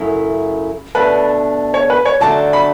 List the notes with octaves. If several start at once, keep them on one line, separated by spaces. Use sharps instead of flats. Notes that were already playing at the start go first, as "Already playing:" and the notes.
Already playing: F#2 C#3 F#3 A3 E4
B2 A3 D4 B4
C#5
B4
C#5
D2 D3 F#3 A3 D4 A5
B5